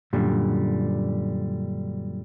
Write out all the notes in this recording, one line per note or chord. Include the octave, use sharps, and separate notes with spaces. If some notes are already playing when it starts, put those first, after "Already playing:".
F#2 A#2 D3 G3